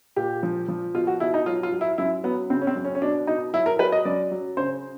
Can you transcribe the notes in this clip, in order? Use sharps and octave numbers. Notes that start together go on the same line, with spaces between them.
A#2 G4
F3
F3
B2 F4
F#4
B2 E4
D#4
F#3 F4
F4
F#3
E4
F#2 E4
F#3 B3
C#3 C4
C#4
C4
F#2
C#4
C#4
B2 D4
B2 D#4
F#3 E4
A#4
F#3 B4
D#5
F#2 D5
F#3
C#3 C5